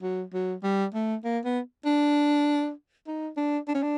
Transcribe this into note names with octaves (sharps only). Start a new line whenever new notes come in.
F#3
F#3
G3
A3
A#3
B3
D4
D#4
D4
D4
C#4
D4